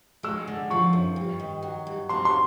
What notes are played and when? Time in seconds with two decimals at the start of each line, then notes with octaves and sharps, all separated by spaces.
0.23 G#3 E6
0.47 D3
0.70 F3 C#6
0.93 F#2
1.16 G2
1.40 D#3
1.63 F#3
1.87 G2
2.09 C4 C6
2.25 C6